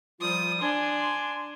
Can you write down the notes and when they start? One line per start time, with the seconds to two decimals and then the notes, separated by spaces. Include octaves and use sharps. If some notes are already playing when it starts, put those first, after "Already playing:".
0.21 F3 G3 F4 D#6
0.61 D4 G#5 C6